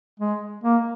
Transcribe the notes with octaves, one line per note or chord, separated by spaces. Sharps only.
G#3
A#3